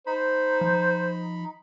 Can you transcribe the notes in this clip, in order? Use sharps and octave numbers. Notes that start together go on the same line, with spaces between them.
D#4 C5 B5
F3